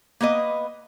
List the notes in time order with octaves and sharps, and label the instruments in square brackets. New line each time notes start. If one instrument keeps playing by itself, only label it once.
[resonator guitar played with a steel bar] A#3 B3 B4 D#5